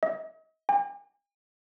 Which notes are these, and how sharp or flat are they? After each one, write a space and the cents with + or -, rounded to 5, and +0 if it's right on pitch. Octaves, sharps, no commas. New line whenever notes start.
D#5 +40
G#5 -45